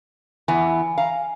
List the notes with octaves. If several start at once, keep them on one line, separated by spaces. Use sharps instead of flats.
E2 E3 B3 G#5
F5 A#5